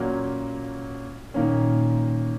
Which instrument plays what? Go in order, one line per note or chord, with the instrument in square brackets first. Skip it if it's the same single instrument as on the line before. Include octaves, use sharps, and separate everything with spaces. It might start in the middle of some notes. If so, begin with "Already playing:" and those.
Already playing: [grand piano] A#2 F#3 A#3 C#4
[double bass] A#2 [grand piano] D#3 A#3 C#4